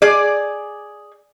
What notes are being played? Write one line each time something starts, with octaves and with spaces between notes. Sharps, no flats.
G#4 D5